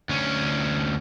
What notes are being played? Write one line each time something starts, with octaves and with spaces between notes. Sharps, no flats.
D2 C#4